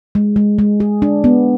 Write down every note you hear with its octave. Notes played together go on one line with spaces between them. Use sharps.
G#3
G#3
G#3
G#4
D4
B3